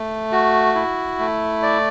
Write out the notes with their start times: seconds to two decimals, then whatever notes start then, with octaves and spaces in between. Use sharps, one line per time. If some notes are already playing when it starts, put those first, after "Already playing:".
Already playing: A3
0.32 F#4
0.75 E4
1.19 A3
1.62 D5